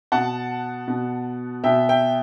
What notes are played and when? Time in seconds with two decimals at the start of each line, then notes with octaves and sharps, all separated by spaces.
0.12 B2 F#5 A5
0.88 B2
1.64 B2 E5 G5
1.89 E5 G5